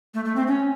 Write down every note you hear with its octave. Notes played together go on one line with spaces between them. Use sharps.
A3
A3
C4
C#4